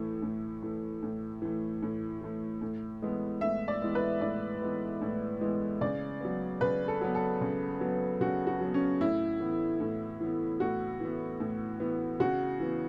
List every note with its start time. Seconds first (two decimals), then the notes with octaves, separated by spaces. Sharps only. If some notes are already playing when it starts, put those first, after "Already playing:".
Already playing: A2 E3 A3
0.22 A2
0.62 E3 A3
1.03 A2
1.42 E3 A3
1.82 A2
2.21 E3 A3
2.61 A2
3.02 E3 G#3 B3
3.41 A2 E5
3.68 D5
3.82 E3 G#3 B3
3.95 B4
4.21 A2 D5
4.62 E3 G#3 B3
5.01 A2
5.41 E3 G#3 B3
5.81 C#3 D5
6.21 F#3 B3
6.61 C#3 B4
6.88 A4
7.01 F#3 B3
7.15 A4
7.41 C#3
7.81 F#3 B3
8.21 C#3 F#4
8.47 F#4
8.61 F#3 B3
8.74 C#4
9.00 A2 E4
9.40 E3 B3
9.80 A2
10.21 E3 B3
10.60 A2 F#4
11.00 E3 B3
11.40 A2
11.80 E3 B3
12.20 C#3 F#4
12.60 E3 B3